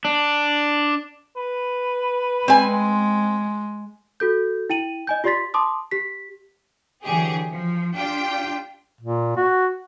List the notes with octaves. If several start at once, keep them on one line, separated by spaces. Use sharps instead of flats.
D4
B4
G#3 C4 G#5
F#4 A4 G6
E4 G5 D#7 F#7
D#5 G#5 G6
F4 G4 D5 C6 A6 B6
A5 C6 D6 D#6
G4 B6
D3 E3 F#3 G4 G#4
F3
D4 F4 G4 G5
A#2
F#4